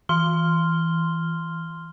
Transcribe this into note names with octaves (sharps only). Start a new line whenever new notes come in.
E3 C6 F6 G7